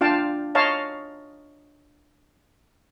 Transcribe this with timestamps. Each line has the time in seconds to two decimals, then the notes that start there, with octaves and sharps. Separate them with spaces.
0.01 D4 F4 F5 G5 A5
0.55 C#5 D#5 F5 A5 A#5